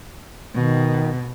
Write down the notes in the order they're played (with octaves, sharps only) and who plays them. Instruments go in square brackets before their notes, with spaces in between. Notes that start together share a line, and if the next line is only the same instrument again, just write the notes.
[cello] B2 [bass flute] D#3